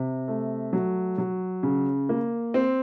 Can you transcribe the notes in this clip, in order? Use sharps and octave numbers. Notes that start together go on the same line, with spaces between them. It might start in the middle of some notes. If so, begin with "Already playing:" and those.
Already playing: C3
A3
F#3
F#3
C#3
A#3
C4